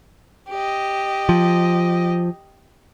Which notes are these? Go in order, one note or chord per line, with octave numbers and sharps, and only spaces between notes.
G4 D#5
F3